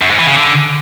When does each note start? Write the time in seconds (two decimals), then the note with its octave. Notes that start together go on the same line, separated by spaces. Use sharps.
0.02 F#2
0.10 G#2
0.19 E3
0.27 C#3
0.36 D3